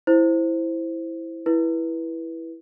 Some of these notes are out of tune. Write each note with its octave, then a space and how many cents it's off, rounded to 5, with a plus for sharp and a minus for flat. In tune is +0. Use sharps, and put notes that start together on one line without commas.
E4 +0 C5 +0
E4 +0 B4 -20